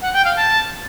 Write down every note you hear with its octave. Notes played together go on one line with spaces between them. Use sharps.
F#5
G5
F5
A5